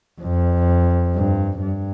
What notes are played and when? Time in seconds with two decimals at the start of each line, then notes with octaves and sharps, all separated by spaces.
0.22 F2
1.16 G2
1.63 G2